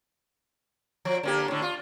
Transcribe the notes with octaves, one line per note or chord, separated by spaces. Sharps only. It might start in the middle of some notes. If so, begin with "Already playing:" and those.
F3
D3 A#3 G4
A2 D3
F4